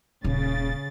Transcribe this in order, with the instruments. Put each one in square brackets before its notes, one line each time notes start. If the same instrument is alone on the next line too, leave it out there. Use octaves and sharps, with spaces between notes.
[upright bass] D#1 [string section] C#3 A6